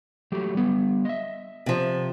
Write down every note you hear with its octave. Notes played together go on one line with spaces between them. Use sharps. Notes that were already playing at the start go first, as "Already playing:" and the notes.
F#3 A3 G4
G3 B3
D#5 E5
C3 F3